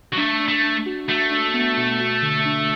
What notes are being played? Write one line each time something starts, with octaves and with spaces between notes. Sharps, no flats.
F#3
A3 D4
D4
A3
D4
F#4
A3 F#4
D4
B3
B2
F#4
D3
D4